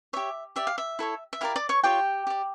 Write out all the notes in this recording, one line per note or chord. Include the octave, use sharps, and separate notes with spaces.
G4 C#5 E5
G4 D5 E5
F5
E5
E4 A4 C#5
E5
E4 G4 A#4 D5 F5
D5 D6
C#5 C#6
F4 G4 C#5 G5
G4 D5